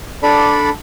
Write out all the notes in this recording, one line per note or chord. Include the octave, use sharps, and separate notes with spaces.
D4 A4 D5 B5